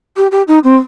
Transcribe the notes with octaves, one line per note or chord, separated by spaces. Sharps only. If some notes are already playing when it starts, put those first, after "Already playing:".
G4
G4
D#4
C4